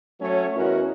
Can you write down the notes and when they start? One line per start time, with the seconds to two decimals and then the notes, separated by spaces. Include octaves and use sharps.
0.21 F#3 A3 C#4 C#5
0.55 E2 C#4 E4 F#4 A#4 D#5